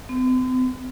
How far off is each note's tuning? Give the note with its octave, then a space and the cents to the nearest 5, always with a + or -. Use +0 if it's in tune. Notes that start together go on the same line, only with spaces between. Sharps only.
C4 -45